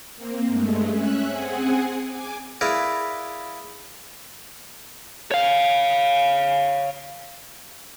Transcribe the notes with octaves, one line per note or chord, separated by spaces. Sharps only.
A#3 C4
G2 G#3 A3
C#4 E5 F#6
C4 G#4 F#5 G#5
G#5 D6
E4 G#4 A#4 B4 D5 F5
C#5 F5